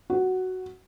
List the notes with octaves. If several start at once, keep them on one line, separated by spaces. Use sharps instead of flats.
F#4